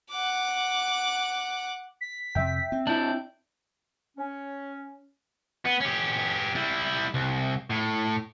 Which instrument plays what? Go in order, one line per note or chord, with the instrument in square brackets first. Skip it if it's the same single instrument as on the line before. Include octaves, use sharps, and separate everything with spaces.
[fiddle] F#5 D6
[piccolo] B6
[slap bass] F2 C3 [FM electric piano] E5 G5
[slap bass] C4
[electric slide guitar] D4 E4 [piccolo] G6
[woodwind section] C#4
[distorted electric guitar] B3
C#4 G4
G3 E4
C2
A2